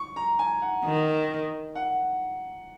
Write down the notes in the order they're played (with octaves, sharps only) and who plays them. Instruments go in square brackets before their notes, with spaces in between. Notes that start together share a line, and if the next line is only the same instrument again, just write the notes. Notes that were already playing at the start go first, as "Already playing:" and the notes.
Already playing: [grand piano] C#6
A#5
G#5
F#5
[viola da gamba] D#3
[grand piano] F#5